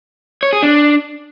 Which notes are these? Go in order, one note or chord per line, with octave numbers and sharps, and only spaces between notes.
C#5
G#4
D4